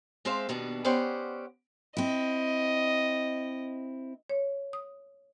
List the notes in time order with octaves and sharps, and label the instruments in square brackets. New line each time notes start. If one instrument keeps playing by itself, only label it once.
[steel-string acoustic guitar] G#3 C4 C5 E5 F5
D#2 B2 B3 D4
B3 C#4 G4 C5 D5 F#5
[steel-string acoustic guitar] C4 E4 [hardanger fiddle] D#5
[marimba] C#5
D#6